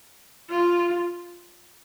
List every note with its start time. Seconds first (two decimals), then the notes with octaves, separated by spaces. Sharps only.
0.51 F4